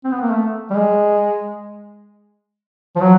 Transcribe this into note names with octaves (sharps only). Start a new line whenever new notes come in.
C4
B3
A#3
A3
G3
G#3
F3
F#3